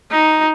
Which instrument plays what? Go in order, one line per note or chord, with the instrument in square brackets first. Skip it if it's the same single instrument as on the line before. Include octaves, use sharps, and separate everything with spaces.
[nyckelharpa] D#4